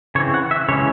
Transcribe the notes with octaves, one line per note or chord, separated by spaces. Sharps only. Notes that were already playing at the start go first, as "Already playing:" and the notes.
C#3 E3 C4 C#5
F#5
E5
C#3 E3 G#3 C#4 C#5